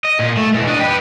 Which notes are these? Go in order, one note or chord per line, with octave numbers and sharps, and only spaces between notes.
D#5
A#2
A3
B2 E3
D4 D#5
G4 B4